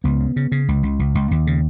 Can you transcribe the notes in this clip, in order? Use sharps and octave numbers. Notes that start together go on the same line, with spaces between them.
C#2 B3
C#3
C#3
C#3
C#2
C#2
C#2
C#2
D#2
C#3